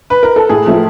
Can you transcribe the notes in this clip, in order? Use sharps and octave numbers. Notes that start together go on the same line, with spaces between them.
B4
A#4
A4
A2 G#4
F3 A3